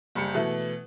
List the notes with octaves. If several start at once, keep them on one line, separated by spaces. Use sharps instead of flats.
F#1 G3 C#7
B2 E3 A3